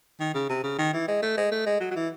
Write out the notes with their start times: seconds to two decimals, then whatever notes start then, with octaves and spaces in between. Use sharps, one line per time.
0.20 D#3
0.34 C#3
0.50 C3
0.64 C#3
0.78 D#3
0.93 E3
1.08 G#3
1.22 A3
1.37 G#3
1.52 A3
1.66 G#3
1.80 F#3
1.91 F#3
1.96 E3